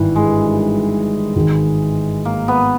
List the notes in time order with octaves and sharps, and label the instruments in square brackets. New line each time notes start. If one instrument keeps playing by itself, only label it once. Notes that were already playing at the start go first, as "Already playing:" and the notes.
Already playing: [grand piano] G#1 G2 D#3 [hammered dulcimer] E3
[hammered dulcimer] G#3
[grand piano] G#1 G#2 D#3
[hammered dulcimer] A#3
B3